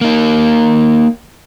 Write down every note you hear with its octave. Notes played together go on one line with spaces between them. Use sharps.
A#3 D#4